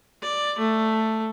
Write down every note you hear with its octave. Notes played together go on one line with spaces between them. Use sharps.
D5
A3